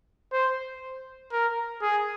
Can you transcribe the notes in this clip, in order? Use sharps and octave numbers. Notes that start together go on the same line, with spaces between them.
C5
A#4
G#4